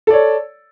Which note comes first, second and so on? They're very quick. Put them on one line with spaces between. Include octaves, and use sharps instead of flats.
A4 D5 C#5